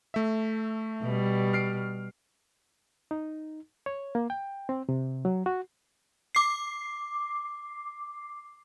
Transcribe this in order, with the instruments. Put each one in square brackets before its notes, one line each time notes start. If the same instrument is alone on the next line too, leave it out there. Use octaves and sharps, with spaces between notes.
[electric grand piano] A3 E5
[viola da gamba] B2 G3
[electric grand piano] F6 C7 D7
[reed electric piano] D#4
C#5
A#3
G5
C4
C3
F#3
F#4
[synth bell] D6 C7